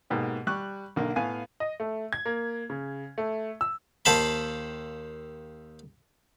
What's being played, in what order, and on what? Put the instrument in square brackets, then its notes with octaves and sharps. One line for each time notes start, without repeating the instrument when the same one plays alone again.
[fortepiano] G#2 B2 A#3 G4
G3 C#6 F#6
B1 D3 A#3
A2 B3 F5 G#5
[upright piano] D#5
A3
G#6
A#3
C#3
A3
E6
[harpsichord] D#2 C5 F5 A5 B5